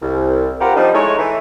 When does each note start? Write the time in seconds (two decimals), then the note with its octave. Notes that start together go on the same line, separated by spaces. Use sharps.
0.02 C2
0.60 C4 F4 G4 A#4 B4 F#5
0.76 F3 G3 C4 D4 D#4
0.94 G#3 A3 D#4 E4 C#5
1.18 E3 A3